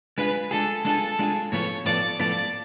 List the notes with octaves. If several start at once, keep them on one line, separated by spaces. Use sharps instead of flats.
G#3 D4 F4 G#4 B4
G#3 D4 F4 G#4 A4
G#3 D4 F4 G#4 A4
G#3 D4 F4 G#4
A2 F3 B3 F4 A4 C#5
A2 F3 B3 F4 A4 D5
A2 F3 B3 F4 A4 D5